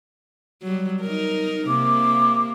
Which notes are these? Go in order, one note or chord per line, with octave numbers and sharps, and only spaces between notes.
F#3 G3
D#4 A#4
C3 A#3 D6